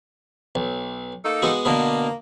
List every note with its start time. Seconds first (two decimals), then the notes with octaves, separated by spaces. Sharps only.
0.55 B1
1.24 A#3 D#4 A4
1.42 G#3 B3 F#4
1.65 B2 D3 A#3 B3